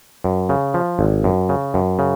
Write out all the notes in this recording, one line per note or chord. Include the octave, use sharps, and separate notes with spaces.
F#2
C#3
F3
G#1
F#2
C#3
F#2
C#3